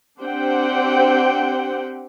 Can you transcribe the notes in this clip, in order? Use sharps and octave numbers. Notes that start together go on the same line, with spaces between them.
C4 D4 G4 C5 F#5 G5